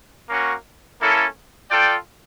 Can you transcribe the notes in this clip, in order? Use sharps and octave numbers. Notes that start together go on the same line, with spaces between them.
A#3 C#4 F#4
A#3 C#4 E4 A4
F4 A4 D5 G5